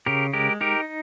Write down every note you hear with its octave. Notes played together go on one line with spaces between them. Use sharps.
C#3 G4 A#4
G#3 G4 A#4
D#4 G4 A#4